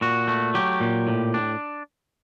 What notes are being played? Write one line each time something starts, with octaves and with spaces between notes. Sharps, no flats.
A#2 F#4
A3
F#3 G4
A#2
A2
D4